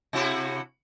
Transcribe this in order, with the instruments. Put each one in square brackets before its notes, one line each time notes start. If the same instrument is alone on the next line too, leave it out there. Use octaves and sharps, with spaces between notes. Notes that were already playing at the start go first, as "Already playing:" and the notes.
[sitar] C3 E4 F#4